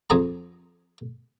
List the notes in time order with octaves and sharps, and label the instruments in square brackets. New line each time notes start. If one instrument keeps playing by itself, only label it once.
[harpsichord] F2 G#4 A#5